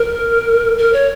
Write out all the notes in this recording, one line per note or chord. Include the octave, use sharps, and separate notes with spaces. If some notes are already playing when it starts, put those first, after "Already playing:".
Already playing: A#4
A#4
C#5